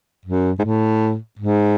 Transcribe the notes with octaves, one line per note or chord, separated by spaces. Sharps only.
F#2
G#2
A2
G#2